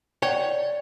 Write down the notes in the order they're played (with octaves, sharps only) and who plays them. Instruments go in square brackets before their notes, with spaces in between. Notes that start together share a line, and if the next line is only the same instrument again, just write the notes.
[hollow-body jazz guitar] C#5 F#5 G5 [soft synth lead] D5